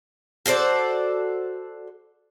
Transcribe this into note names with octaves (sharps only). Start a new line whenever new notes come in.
F#4 A4 C5 D5